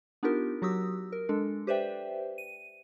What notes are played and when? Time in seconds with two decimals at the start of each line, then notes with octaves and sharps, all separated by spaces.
0.23 B3 D4 D#4 F4 G4 A#4
0.62 F#3 F#4 G4 D#6 E6
1.12 A#4
1.29 G#3 D4 A4
1.67 G4 B4 C5 D5 E5 G5
2.38 D#7